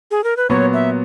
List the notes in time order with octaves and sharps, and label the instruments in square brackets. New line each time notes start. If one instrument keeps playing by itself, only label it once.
[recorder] G#4
A#4
B4
[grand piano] A#2 F#3 B3 F#4 [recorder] C#5
[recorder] E5